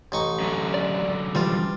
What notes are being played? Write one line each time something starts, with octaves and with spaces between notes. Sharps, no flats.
A1 D#4 C#6
F#2 D3
D5
E3 F3 G3 F4